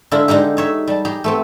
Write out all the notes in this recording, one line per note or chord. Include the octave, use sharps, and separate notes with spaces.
D3 G#3 E4 F4
D3 G#3 D#4 G4
D#4 C#5 E5
G3 A5
G4 G#4 A#5
A3 B3 C4